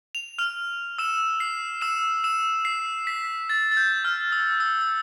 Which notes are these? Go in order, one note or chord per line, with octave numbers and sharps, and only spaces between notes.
F7
F6 F7
E6 E7
C7
E6 E7
E6 E7
C7
B6
A6
A6
G6
F6
E6
E6
E6